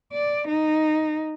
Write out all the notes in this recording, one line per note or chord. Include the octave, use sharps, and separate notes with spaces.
D5
D#4